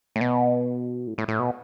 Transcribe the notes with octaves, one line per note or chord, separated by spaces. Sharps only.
A2
B2
A2
A2
A2
B2